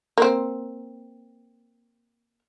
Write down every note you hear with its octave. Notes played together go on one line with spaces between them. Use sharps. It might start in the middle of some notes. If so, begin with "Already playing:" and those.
A#3 C4